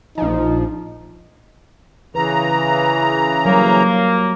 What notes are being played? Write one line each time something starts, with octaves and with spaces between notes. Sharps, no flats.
A#1 F3 D#4
C#3 E3 B4 A#5
F#3 G3 A#3 C5